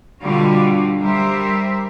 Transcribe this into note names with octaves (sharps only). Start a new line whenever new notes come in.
B2 D3 G3 F4 F#4
G3 A#4 C5 E5